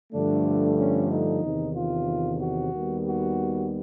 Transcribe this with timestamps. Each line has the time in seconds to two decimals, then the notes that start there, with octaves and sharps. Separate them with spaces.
0.12 G2 D3 F3 A3 D4
0.77 C#4
1.10 D#4
1.43 E2 C3 D#3
1.75 F4
2.40 F#4
2.72 D#2 D#3 G3 B3
3.06 F#4